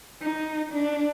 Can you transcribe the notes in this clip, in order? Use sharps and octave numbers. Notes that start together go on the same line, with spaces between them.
D#4
D4